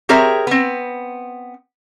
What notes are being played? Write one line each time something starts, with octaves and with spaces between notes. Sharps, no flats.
C4 G4 G#4 A#4 C#5 E5
B3 C4